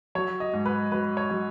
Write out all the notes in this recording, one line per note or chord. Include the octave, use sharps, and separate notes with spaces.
F#3 C#5
D#5
G#2
B4
F#3 B4
C#5
F#3